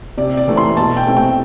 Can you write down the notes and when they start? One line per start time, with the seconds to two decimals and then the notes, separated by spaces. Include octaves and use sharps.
0.18 C3 D5
0.37 D5
0.47 E3 A3 C4
0.57 C6
0.77 B2 A5
0.97 G5
1.07 A3 C4
1.17 G5